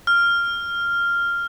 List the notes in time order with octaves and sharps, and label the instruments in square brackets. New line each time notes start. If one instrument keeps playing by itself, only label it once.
[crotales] F6